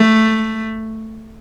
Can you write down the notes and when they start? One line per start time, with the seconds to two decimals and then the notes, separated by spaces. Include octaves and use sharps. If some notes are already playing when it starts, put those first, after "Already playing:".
Already playing: A3